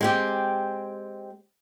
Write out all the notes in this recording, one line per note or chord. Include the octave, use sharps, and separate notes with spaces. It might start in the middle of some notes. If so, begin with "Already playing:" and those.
G#3 C4 G4